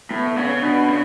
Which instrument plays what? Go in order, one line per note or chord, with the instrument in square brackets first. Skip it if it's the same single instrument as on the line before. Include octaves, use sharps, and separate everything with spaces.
[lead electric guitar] A2 [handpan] B3
[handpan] B3
[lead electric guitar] C#3
[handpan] C#4
[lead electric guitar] B2 [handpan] D4
[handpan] D4
[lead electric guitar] C#3